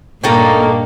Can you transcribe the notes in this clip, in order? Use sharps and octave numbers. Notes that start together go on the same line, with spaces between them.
G2 A#2 A#3 D#4 A4 C#5 G5 A#5